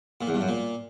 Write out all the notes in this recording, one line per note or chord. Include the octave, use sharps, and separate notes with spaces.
A#2
E2
G2
F#2
A#2